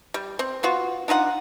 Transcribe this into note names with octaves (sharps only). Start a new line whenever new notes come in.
G3
C4
B3 F4 F#4
D4 D#4 F4 F#5